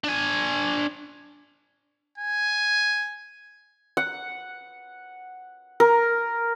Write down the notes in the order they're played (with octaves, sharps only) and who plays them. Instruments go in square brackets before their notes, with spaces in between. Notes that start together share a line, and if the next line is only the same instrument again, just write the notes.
[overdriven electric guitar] D4 G#5
[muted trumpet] G#5
[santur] F#5
A#4